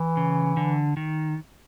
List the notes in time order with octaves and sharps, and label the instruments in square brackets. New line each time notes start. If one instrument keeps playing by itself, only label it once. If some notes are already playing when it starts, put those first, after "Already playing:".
Already playing: [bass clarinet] E3
[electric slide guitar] C#3
D3
D#3